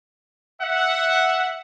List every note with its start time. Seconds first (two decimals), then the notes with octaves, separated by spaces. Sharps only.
0.61 E5 F#5